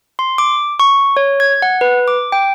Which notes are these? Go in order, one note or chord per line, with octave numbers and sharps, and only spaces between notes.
C6
D6
C#6
C#5
G#6
F#5
B4
D6
G5